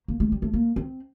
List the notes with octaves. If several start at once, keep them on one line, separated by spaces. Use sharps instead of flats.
A#3
A3
G3
A3
A#3
C4